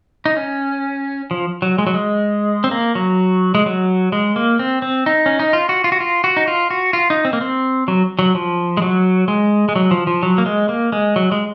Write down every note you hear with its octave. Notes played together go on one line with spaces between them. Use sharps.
D#4
C#4
F3
F#3
G#3
F#3
G#3
C4
A#3
F#3
G#3
F#3
G#3
A#3
C4
C4
D#4
C#4
D#4
F4
F#4
F4
F#4
F4
F#4
D#4
F4
F#4
F4
D#4
C4
A#3
C4
F#3
F#3
F3
G#3
F#3
G#3
G#3
F#3
F3
F3
F#3
A#3
G#3
A#3
G#3
F#3
G#3